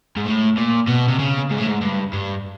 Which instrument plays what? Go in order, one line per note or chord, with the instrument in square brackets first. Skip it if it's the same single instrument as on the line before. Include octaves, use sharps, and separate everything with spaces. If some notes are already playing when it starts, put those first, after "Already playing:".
[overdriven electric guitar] G#2
A2
A#2
B2
C3
C#3
G#2
A2
G#2
G2
G2